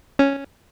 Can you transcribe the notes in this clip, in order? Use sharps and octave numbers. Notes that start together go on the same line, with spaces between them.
C#4